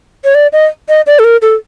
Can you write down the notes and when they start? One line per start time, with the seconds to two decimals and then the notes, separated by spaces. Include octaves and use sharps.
0.24 C#5
0.35 D5
0.53 D#5
0.89 D#5
1.07 D5
1.19 A4
1.24 A#4
1.42 A4